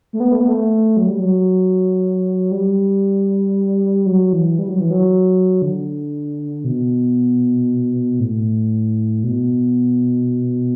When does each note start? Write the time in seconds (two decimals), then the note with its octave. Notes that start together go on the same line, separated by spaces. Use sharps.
0.13 A3
0.20 B3
0.32 A3
0.40 B3
0.48 A3
0.97 F#3
1.08 G3
1.19 F#3
2.52 G3
4.06 F#3
4.33 E3
4.59 G3
4.69 F#3
4.80 E3
4.91 F#3
5.62 D3
6.64 B2
8.20 A2
9.24 B2